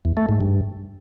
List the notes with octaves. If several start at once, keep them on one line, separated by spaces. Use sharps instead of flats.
E2
A3
G#2
G2